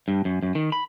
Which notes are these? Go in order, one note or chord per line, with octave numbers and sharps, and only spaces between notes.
G2
F#2
F#2
D#3
B5